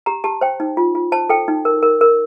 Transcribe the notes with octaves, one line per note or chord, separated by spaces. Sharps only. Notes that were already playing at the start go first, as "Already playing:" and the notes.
G4 A#5
G4 A5
C5 G5
D#4
F4
F4
C5 A5
A4 G5
D#4
A#4
A#4
A#4